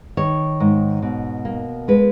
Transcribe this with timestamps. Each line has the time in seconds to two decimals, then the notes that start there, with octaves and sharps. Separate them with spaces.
0.17 D#3 C#5
0.60 G#2
1.02 B2
1.45 A#3
1.88 G#3 B4